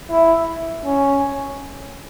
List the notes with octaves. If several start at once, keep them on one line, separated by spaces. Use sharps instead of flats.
E4
C#4